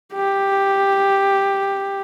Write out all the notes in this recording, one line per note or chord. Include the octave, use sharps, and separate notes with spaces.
G4